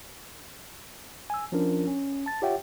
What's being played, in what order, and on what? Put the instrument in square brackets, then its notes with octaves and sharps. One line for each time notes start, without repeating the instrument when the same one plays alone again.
[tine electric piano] G#5 E6
F3 C#4 D4 F4 A#4
C#4
A5 A6
F4 G4 C#5 E5 F#5 G5